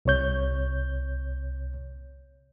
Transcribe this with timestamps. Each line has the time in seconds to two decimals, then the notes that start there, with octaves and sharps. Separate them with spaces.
0.05 C2 C3 C#5 G6